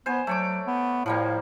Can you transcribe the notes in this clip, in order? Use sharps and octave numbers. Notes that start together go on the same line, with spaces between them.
B3 C5 G#5
F#3 A3 C#5 D6
B3
A2 F3 G3 A#3